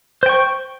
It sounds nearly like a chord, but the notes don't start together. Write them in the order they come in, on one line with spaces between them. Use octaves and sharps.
C5 G5 C#6